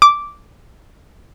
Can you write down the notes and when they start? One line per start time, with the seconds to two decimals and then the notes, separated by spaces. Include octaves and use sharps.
0.02 D6